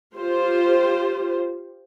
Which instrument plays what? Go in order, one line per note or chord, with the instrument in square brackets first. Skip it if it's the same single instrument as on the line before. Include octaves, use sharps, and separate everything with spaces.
[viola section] F4 G4 C5